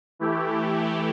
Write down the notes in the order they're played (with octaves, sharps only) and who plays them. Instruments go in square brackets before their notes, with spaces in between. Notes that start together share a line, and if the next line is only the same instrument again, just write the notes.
[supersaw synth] E3 A3 E4 G4